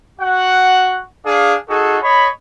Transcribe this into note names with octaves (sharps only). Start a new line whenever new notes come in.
F#4 F#5
D4 G#4 F5
D#4 F#4 G#4 A4
C#5 D#5 B5